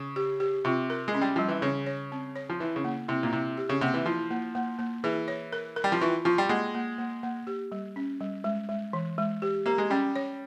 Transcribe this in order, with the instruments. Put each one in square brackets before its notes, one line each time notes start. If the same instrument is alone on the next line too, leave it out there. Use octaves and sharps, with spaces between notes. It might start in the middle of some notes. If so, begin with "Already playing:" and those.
Already playing: [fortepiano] C#3
[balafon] G4
G4
[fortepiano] C3 [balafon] F4
[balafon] A#4
[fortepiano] G#3
[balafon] C#4
[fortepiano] G3
[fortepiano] F3 [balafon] G3
[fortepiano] E3
[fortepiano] C#3 [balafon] C#5
[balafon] C#5
C4
C#5
[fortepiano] F3
[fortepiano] E3 [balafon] E4
[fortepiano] C#3
[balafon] A#3
[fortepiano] C3 [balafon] E4
[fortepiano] A#2
[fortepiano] C3 [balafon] E4
[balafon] G4
[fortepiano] C#3
[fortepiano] C3 [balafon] A#3
[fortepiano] E3
[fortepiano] F3 [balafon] E4
[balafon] A#3
A#3
A#3
[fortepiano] E3 [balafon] G#4
[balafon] C#5
A#4
A#4
[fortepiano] G3
F3
[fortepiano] E3 [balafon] F4
[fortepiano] F3 [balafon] F4
[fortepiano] G3
[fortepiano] G#3 [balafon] A#3
[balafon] A#3
A#3
A#3
G4
G3
C#4
G3
G#3
G#3
E3
G#3
G4
[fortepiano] A#3 [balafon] G4
[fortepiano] G#3
[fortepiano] G3 [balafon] C#4
[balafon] C#5